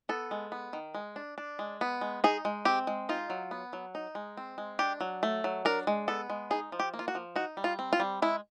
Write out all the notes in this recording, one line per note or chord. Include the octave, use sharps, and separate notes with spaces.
B3 A4
G#3
B3
D#3
G#3
D4
D4
G#3
B3
G#3
D#4 G#4
G#3
C4 G4
G#3
D#4 F4
F#3
B3
F#3
D#4
G#3
C4
G#3
D4 G4
F#3
A3
F#3
D4 A#4
G#3
B3 A4
G#3
D#4 G#4
F3
G4
A#3
F4
F#4
F3
D#4 F#4
G3
F4
C4
F4
G3
G#3 E4